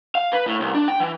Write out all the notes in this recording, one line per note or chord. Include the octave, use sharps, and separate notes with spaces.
F5
B4
A2
C2
D4
G5
E3